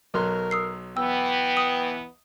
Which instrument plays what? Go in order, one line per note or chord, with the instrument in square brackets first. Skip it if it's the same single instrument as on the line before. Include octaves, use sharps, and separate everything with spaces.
[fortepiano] B1 F#3 C6 [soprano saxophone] A#4
[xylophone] D#6 E6 C7
[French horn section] E3 B3 [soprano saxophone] G5 [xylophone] E6
[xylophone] D#6